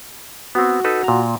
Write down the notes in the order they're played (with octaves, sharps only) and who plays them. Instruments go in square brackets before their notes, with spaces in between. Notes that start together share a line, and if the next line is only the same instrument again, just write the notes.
[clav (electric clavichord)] B3 C4 [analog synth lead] F#4
[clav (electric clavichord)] D#4 A4 B4
A#2 A#5